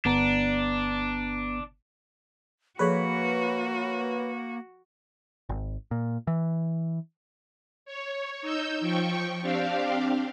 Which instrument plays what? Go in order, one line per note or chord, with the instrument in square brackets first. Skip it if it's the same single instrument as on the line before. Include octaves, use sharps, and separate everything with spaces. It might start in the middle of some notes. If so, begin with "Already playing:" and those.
[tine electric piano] G1 B3 A#5 [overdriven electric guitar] D4
[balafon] F3 G#4 A4 [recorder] A#3 [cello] F#4 [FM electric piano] B4 C#5 B5
[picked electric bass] G#1
A#2
E3
[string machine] C#5
D#4 E6 G6
F3 G5 C#6
C4 D4 G4 F5